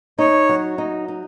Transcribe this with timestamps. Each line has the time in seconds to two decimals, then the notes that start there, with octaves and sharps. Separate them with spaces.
0.19 D#4 C#5
0.49 F#3
0.78 D#4
1.08 D#4